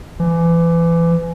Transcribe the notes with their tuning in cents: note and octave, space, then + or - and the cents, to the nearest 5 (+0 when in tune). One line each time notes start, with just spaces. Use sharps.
E3 +30